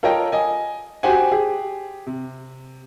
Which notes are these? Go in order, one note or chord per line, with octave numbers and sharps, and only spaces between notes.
F4 A4 A#4 C#5 D#5 G5
D#5 G#5
F#4 G4 C5 F#5 G#5
G4 G#4
C3